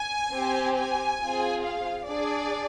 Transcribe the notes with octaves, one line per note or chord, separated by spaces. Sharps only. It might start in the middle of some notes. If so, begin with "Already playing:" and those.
Already playing: G#5
C4 G4
G#5
C4 F4 G#4
F5
D4 G#4 D5